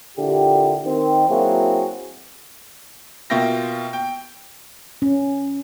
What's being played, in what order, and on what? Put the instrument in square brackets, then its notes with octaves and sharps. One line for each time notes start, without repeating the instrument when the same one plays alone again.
[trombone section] A#2 D3 E4 G4
D#3 C4
F#3 A#3 C4 E4 F#4 G#4
[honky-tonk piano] B2 A#3 F4 E5 G5 A#6
G5
[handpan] C#4